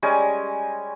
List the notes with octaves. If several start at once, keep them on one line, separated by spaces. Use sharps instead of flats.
G3 G#3 C#4 G#5